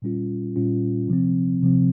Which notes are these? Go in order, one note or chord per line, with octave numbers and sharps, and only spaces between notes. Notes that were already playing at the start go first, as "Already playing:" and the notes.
A#2 G3 C#4 F4
A#2 G3 C#4 F4
C3 F3 C4
C3 F3 C4